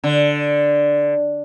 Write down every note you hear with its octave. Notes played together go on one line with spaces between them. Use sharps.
D3